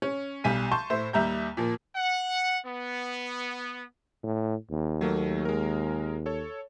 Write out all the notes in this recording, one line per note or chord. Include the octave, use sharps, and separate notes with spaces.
C#4
B1 G3 G#5 B6 D#7
A5 C6 C#6 G6
A2 C5 E5
D#2 G3 E5 A#5 G6
A#2 F3 A#3
F#5
B3
A2
D#2
F#3 A3 A#3
G#3 A#4
A4 C#5